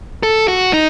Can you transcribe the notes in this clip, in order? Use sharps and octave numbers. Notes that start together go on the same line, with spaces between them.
A4
F#4
D#4